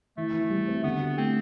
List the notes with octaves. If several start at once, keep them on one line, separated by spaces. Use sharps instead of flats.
E3 A3
E3
G3
C4
D3 B3
G4
A3 C4